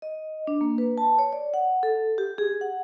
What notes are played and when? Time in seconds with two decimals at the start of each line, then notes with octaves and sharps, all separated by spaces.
0.02 D#5
0.47 D4
0.61 A#3
0.78 B4
0.98 A5
1.19 C#5
1.33 D5
1.54 F#5
1.83 A4
2.18 G4
2.38 G#4
2.61 F#5